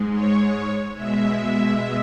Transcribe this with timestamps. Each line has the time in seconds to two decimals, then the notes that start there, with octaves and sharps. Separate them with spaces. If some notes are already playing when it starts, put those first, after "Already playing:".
Already playing: G#2 G#3
0.12 C#5
0.94 B2 G#3 E5